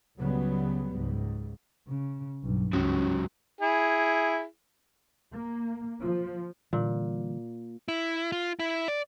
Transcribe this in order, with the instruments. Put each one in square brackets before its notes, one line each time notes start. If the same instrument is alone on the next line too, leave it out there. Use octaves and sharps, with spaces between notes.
[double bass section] C#2 C#3 F#3 G3 B3
C#2 G#2
[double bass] C#3
B1 G2
[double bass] C#2 [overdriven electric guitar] G#2 F#3 [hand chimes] C#4
[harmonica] E4 G#4
[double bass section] A#3
F3
[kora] A#2 [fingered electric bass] D3 E3 G3
[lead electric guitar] E4
F4
E4
D5